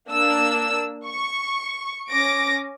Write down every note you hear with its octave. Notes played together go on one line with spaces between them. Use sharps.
A#3 D4 E6
C#6
C#4 D6 A#6 D7